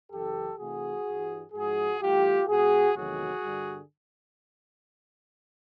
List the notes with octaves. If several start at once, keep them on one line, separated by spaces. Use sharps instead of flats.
F#2 C#3 E3 G4 A4
C3 E3 A3 F#4 G#4
G2 E3 G3
G#2 F3 G#3 F#4 G#4
G2 E3 A3 F4 G4
B2 G#3 F#4 G#4
E2 C3 D#3 F#3 A3 F#4 G#4
G2 D3 G3